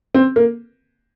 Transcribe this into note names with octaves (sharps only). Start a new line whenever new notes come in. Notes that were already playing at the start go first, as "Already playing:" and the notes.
C4
A#3